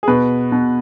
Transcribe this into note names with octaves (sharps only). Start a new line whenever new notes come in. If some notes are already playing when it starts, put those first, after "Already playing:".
G#4
B2 B4
B2